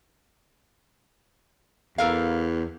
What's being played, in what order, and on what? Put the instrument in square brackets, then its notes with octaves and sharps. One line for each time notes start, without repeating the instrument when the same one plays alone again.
[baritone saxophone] E2 [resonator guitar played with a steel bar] A4 A#4 F5